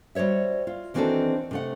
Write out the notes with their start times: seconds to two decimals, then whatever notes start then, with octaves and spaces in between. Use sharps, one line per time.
0.15 G3 F#4 C5 C#5 E5
0.67 F4
0.94 D#3 E3 C4 D4 F#4 A4
1.51 C3 A3 F#5